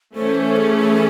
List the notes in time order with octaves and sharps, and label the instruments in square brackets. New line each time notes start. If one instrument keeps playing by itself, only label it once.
[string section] E3 A3 C#4 [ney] C5
[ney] G#4